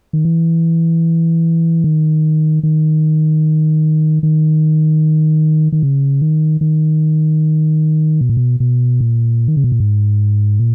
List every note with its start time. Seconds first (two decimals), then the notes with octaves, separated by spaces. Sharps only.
0.13 D#3
0.25 E3
1.84 D#3
2.63 D#3
4.23 D#3
5.72 D#3
5.83 C#3
6.22 D#3
6.61 D#3
8.21 B2
8.29 A#2
8.37 B2
8.60 B2
9.00 A#2
9.48 D#3
9.57 C#3
9.64 B2
9.72 A#2
9.80 G#2
10.59 A#2